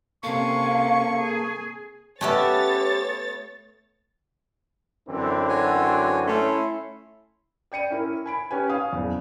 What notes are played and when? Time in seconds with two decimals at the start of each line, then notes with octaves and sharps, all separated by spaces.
0.23 C3 A#3 C#4 A4 F5 C#6
1.18 G#4
2.21 A3 B3 C#4 G4 C#5 E5 A6
5.09 F#2 D3 E3 C4
5.49 F#4 C#5 G#5
6.27 A3 C#4 E4 C6
7.72 D5 G5 C#7 D#7
7.90 C#4 E4 A#4
8.26 G#5 B5 D7
8.51 C#4 G4 B4 G#5
8.70 F5 G#5 D#6
8.93 F#1 E2